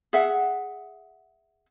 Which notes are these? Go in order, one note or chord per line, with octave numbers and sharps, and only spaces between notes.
G#4 E5 F#5